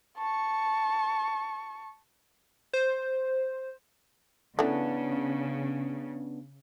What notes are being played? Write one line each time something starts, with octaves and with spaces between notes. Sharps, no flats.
A5 C#6
C5
C#3 E3 A3 B3 D4